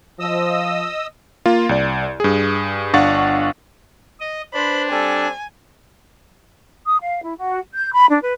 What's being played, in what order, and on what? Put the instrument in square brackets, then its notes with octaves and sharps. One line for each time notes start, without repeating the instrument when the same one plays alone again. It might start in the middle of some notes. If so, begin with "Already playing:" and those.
[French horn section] F3 [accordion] D#5 D#6 E6
[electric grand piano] A#3 F4
C2 D5
G2 G#4
G1 D4 F5 F#5 C#6 A6
[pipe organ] D#5
[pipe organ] D4 [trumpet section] B4 C5 [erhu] B5
[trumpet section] G3 C4 A4 [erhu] G#5
[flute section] D#6
F5
E4
F#4
G6
B5
D4
B4